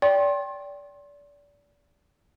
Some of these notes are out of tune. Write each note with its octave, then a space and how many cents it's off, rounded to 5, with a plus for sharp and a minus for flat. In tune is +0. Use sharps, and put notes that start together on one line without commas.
D5 -30 G5 +0 C6 +30